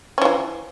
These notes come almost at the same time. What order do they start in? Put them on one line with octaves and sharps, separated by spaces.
C#4 F3 E3